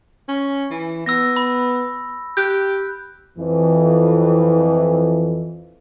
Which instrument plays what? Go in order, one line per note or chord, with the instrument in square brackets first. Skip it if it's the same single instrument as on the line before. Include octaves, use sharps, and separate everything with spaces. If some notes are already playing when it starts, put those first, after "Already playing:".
[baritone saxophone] C#4
E3
[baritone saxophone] B3 [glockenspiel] E6 A#6
[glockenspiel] B5
[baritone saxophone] G4 [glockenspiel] F#6 G6
[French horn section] F2 E3